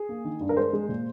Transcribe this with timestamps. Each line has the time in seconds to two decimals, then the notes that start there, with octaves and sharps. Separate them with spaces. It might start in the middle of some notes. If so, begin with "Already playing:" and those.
Already playing: G#4
0.09 A#3
0.24 D#3
0.40 G2
0.49 A#4
0.56 G#3 C5
0.73 G#3
0.89 A#2